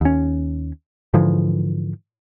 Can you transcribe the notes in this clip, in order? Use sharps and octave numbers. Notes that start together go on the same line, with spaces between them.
D#2 C#4
G#2 D3 E3 F3